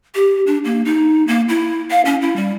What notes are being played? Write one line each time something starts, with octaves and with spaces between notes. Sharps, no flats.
G4
D4
A#3
D#4
A#3
E4
F5
C#4
E4
G3